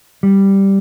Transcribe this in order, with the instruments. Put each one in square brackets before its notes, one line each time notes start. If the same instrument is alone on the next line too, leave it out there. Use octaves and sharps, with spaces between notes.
[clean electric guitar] G3